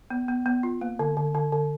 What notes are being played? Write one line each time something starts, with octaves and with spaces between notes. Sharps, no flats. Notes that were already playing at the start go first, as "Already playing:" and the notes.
B3
B3
B3
F4
A#3
D3
D3
D3
D3